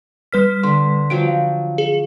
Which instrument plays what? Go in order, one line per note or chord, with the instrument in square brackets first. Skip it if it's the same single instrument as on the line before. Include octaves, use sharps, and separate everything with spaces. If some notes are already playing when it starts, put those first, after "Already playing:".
[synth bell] G3 B4 B6 [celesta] F6
[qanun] D3 [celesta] C6
[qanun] F3 F#3 G5 [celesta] D7
[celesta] F5
[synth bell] G#4